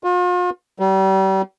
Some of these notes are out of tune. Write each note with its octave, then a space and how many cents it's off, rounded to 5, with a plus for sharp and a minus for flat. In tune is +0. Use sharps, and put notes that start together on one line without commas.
F4 +40
G3 -35